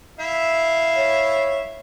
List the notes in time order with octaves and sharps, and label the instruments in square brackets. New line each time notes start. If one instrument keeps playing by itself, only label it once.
[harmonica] E4 E5 F5
[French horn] C#5